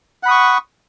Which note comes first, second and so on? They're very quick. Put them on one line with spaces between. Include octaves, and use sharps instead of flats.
F#5 B5 D#6 C#6